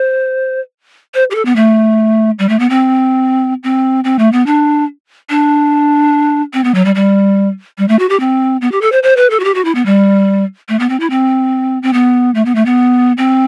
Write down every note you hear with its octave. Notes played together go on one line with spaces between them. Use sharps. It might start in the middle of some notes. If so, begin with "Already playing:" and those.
Already playing: C5
C5
G4
A4
B3
A3
G3
A3
B3
C4
C4
C4
A3
B3
D4
D4
C4
B3
F#3
G3
G3
G3
A3
F#4
G4
C4
B3
G4
A4
C5
C5
B4
A4
F#4
G4
F#4
E4
B3
G3
A3
B3
C4
E4
C4
C4
B3
A3
B3
A3
B3
C4